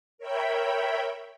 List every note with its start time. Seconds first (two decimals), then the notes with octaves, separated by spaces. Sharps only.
0.18 A#4 C#5 E5 G5 B5